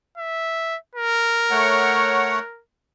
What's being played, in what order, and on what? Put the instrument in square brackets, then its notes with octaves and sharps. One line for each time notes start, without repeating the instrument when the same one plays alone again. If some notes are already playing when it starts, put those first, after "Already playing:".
[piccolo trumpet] E5
A#4
[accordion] A3 C#5 F#5